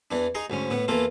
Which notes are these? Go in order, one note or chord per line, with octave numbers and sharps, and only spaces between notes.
E2 E3 D4
D#4 G#4 A#5 C6
D2 G#2 C#4
A2 B3 F#5
E2 E3 A#3 F4 A4 A#4